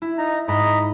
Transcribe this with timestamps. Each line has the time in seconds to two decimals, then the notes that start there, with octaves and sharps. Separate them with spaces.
0.02 E4
0.18 D#4 A#5
0.48 G#2 D#5 A#5 B5